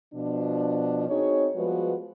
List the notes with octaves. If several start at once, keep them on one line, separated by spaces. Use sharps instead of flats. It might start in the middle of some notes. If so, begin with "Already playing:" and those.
B2 F3 D4
C4 D#4 F#4 G#4 C#5
F3 G3 G#3 B3 F#4 B4